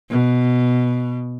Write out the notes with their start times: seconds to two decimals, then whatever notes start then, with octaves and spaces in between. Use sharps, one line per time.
0.11 B2